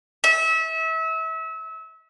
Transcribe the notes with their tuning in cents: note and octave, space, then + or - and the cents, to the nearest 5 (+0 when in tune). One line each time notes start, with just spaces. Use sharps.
E5 -30